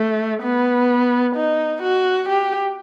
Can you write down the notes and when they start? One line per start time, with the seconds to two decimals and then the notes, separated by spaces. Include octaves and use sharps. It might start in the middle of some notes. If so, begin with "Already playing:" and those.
Already playing: A3
0.42 B3
1.36 D#4
1.82 F#4
2.29 G4